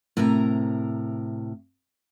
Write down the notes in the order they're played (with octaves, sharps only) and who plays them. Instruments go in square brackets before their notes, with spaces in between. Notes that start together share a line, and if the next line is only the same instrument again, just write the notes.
[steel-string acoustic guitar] A2 C3 A#4 A#5